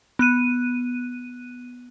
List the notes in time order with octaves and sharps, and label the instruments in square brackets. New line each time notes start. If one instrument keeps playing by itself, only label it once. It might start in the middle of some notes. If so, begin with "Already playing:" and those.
[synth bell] B3 F#6 D#7